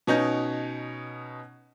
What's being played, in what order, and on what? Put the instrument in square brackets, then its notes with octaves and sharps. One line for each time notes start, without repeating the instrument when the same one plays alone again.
[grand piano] B2 C#4 D#4 G6